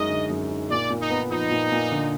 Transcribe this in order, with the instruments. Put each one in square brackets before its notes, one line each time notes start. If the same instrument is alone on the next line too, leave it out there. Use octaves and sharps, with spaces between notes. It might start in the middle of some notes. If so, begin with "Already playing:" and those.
Already playing: [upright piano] F#2 G#3 D#4 [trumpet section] D#5
[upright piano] D3
F#2
D#4
[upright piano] A#2 [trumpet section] D5
[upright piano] A#2
[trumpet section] D#4
[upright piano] B3
[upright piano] F3 [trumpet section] D#4
[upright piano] A#2
A#2
D3